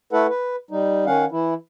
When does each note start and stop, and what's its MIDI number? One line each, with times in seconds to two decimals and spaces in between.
0.13 0.27 57
0.13 0.27 64
0.13 0.27 69
0.13 0.27 71
0.13 0.27 78
0.29 0.56 71
0.71 1.05 55
0.71 1.05 63
1.06 1.25 51
1.06 1.25 61
1.06 1.25 77
1.06 1.25 78
1.31 1.54 52
1.31 1.54 64